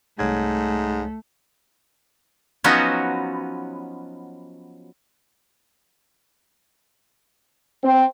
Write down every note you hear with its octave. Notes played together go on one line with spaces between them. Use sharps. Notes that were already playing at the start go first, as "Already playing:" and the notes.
C2 G#2 A3 C#5 G#6
F3 F#3 B3 C#4 D#4 F#4
C4